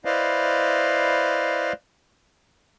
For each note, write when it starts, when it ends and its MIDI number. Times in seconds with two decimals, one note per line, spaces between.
0.05 1.73 64
0.05 1.73 71
0.05 1.73 72
0.05 1.73 74
0.05 1.73 75
0.05 1.73 77